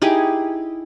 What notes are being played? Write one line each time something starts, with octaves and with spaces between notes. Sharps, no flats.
D#4 E4 G4 G#4